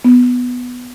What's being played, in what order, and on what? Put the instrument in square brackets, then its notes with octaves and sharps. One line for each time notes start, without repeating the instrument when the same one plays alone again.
[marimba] B3